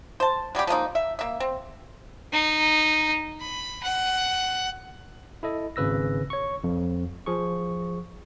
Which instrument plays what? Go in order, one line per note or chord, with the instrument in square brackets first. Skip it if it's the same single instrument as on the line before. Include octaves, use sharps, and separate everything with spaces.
[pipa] C5 A5
F#3 G3 C#4 G4
F3 G#3 A#3 D#4
E5
A#3 E5
C4
[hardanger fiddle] D#4
B5
F#5
[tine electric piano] E4 A4 D#5
G#1 C#3 B4 E6 A#6
C#5 C#6
F2
F3 G#4 C#6